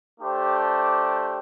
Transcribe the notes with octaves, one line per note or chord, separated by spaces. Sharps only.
A3 D4 G4 C5